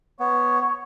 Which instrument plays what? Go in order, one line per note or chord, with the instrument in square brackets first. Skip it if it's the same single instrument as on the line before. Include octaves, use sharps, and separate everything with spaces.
[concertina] B3 [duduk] C#5